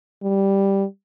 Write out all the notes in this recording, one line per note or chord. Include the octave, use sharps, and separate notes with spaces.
G3